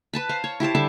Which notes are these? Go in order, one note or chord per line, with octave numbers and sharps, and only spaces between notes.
B4 A5 B5
C5 F5
C#5
E4 G4 C5 A5
D3 G3 E5 A5